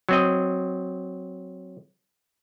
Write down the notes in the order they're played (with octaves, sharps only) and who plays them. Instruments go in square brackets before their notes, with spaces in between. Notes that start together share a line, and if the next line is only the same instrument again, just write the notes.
[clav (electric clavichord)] F#3 C4 D#5